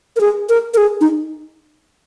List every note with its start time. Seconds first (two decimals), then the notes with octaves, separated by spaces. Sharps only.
0.16 A#4
0.21 G#4
0.49 A#4
0.74 A#4
0.77 G#4
1.01 D#4